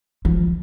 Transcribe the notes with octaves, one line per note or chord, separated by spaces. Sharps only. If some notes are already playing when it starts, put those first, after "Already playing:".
F3